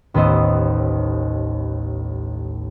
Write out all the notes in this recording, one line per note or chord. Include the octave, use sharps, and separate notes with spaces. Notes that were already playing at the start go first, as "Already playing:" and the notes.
A1 D#2 B3 C5 D#5 E6